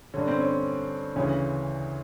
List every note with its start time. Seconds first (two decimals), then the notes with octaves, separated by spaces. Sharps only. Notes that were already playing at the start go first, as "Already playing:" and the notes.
0.14 G2 D3 C#4
0.28 C4
0.40 C#4
1.16 D2 C#3 E3 C#4